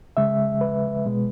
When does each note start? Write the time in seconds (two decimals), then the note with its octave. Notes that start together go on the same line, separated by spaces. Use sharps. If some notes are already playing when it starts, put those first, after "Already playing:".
0.17 C#3 G#3 E5
0.61 B4
1.06 B2 G#3